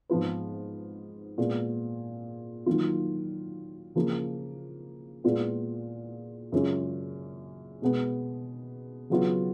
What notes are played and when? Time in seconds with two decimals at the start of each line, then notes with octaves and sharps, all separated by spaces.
0.09 G#2 F3 B3 F4 B4
1.38 A#2 G#3 B3
2.66 D#3 F#3 A#3 F4
3.95 C#3 F3 A#3 F4
5.24 A#2 G#3 B3 F4
6.52 F#2 C#3 G#3 C#4 F4
7.82 B2 G#3 B3
9.10 C#3 F#3 B3 F4